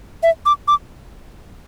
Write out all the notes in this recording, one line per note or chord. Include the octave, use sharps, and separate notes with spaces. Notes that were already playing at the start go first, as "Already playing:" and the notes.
E5
D6
D6